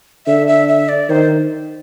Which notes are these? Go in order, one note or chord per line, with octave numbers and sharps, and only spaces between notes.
D3 E5
E5
E5
D5
D#3 C5